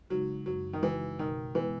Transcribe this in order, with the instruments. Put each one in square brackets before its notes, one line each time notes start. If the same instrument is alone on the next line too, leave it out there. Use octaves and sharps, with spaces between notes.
[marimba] C#3 G#3 D#4 F#4 [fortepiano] F#3
[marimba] F#2 [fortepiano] F#3
[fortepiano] D#3
[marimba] C#3 G#3 D#4 F#4 [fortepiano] E3
[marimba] B2 [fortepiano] D#3
[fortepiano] E3 [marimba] G#3 B3 E4 B4